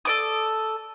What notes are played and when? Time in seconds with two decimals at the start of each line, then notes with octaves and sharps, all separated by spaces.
0.05 A4 D5 D#6